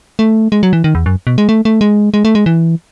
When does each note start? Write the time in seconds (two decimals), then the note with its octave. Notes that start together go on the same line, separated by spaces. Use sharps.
0.19 A3
0.52 G#3
0.63 F#3
0.73 E3
0.84 D#3
0.95 E2
1.06 F#2
1.27 B2
1.38 G#3
1.49 A3
1.65 A3
1.81 G#3
2.14 G#3
2.25 A3
2.35 G#3
2.46 E3